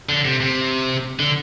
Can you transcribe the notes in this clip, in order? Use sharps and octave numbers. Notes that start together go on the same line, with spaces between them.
D3
C3
C3
D3